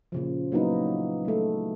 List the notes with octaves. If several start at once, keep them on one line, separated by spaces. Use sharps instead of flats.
A#2 C#3 F3
F#3 A#3 B3 D#4 E4
G#3 A3